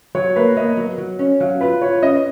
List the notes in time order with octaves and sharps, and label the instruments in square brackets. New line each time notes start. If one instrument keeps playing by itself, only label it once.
[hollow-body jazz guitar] F#3 [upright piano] C#5
[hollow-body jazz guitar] A#3 [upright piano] B4
[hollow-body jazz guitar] A#3 [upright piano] D#5
[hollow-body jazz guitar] F#3
F#3
C#4
[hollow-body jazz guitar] F#3 [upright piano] F5
[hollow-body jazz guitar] F4 [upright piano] B4
[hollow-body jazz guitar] F4 [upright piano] C#5
[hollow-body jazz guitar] C#4 [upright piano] D#5